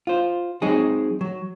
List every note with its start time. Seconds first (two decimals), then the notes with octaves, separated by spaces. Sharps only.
0.07 F4 C5
0.62 F#3 G#3 C4 D#4 G#4
1.21 F#3